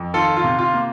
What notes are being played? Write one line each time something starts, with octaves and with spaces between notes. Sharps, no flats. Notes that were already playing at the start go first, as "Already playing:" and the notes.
Already playing: F2
D#3 F4 A4
F4
C3
F4
A#3